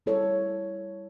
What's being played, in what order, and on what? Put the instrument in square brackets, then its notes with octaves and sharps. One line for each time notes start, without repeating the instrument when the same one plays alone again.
[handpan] G3 E4 A4 C#5